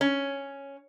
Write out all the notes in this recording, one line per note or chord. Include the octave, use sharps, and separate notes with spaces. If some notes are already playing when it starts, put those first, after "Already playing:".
C#4